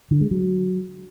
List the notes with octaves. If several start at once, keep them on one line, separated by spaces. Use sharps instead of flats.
D3
G#3
F#3